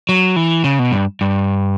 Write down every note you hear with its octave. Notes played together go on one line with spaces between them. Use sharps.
F#3
E3
C#3
B2
G2
G2